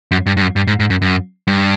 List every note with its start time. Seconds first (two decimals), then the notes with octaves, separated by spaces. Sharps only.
0.11 F#2
0.26 G2
0.37 G2
0.41 F#2
0.56 G2
0.67 G#2
0.80 G#2
0.90 F#2
1.02 F#2
1.47 G2